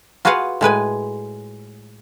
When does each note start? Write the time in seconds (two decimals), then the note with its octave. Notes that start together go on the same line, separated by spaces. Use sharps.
0.25 F4 F#4 G#4 B4 F5 F#5
0.61 A2 G#3 B4 G#5